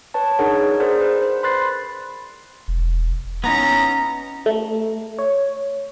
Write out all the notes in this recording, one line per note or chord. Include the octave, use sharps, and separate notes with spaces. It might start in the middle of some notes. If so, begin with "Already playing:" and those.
B4 C#5 A5
D4 D#4 G#4 A#4 C#5 F#5
G#4 A#4 C5 D5
B4
C5
B5 C6 F#6 A6 C7
E1
B3 C#4 D#4 E4 A#5
A3
C#5